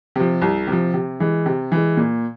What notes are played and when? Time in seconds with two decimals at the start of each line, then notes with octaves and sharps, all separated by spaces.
0.16 C3 F3
0.42 C2
0.67 C3 F3
0.94 C3
1.20 E3 G#3
1.46 C3
1.72 E3 G#3
1.97 A#2